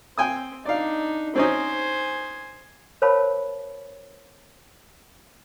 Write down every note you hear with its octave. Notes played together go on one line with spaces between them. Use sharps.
C4 G5 G#5 D#6
D4 D#4 D5 F5
C4 C#4 D#4 C5 G#5
A#4 C5 C#5 F5 A5 B5